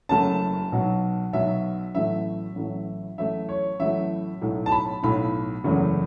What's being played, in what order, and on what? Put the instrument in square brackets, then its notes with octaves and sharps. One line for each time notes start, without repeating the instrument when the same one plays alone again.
[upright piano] F#1 F#2 F#3 A3 A5
B1 B2 F#3
B1 B2 F#3 E5
A1 A2 F#3 A3 E5
A1 A2 F#3 A3
A1 A2 F#3 A3 E5
C#5
A1 A2 F#3 A3 E5
B1 A2 F#3 A3
A5
B5
B1 A2 F#3 A3 B5
F#1 E2 C#3 F#3 A3